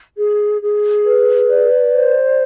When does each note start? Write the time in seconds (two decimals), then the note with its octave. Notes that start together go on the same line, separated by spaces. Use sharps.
0.17 G#4
0.61 G#4
1.05 B4
1.49 D5
1.93 C5